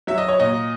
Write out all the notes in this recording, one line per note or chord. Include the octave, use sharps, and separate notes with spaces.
F#3 E5
D#5
C#5
A#2 D#5